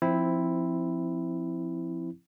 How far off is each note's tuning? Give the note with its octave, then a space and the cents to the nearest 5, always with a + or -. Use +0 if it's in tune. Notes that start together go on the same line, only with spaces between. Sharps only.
F3 -15 C4 +0 E4 +0